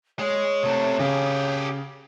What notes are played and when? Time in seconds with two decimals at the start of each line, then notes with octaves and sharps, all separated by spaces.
0.19 G#3 C#5
0.63 C3 A3
1.00 C#3 G4 G#4